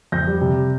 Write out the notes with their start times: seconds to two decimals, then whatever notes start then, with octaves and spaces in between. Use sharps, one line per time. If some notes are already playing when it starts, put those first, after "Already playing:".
0.12 F2 G6 A#6
0.27 G3
0.41 C3